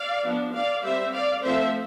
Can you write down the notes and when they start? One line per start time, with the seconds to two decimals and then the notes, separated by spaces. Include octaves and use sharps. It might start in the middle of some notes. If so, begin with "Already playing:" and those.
Already playing: D5 F5
0.25 F3 B3 D4
0.54 D5 F5
0.83 G3 C4 C5 E5
1.13 D5 F5
1.43 F3 A3 C4 C5 E5